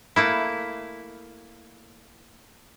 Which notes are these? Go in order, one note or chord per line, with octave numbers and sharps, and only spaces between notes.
A3 A#3 E4